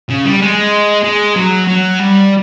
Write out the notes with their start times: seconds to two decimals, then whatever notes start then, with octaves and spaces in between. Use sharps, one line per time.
0.09 C#3
0.25 G3
0.41 G#3
1.04 G#3
1.36 F#3
1.68 F#3
2.00 G3